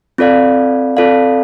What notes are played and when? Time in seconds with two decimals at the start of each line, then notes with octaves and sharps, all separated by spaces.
0.18 C4 F4 A4 D5 F5
0.97 C4 F4 A4 D5 F5